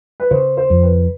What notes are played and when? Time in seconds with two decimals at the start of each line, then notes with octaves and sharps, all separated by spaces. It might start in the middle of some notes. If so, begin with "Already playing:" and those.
0.20 B4
0.31 C#3 C5
0.57 C5
0.70 F2
0.83 B4